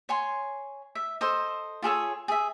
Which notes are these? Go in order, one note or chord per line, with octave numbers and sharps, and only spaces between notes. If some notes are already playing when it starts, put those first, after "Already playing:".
C#5 G#5 C6
E5
A4 C5 D#5
F4 G#4 A4 C#5
G#4 E5